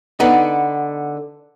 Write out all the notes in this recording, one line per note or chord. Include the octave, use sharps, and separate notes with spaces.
D3 B3 D#4